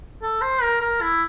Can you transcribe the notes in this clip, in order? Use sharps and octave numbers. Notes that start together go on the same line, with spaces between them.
A4
C5
A#4
A#4
E4